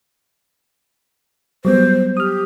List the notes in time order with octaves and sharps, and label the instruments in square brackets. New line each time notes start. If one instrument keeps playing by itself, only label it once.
[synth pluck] F#3 G3 B3 [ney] C5
[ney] G4 [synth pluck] D#6 F6